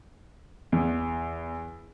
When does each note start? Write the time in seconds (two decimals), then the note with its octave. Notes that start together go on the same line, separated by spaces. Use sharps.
0.72 E2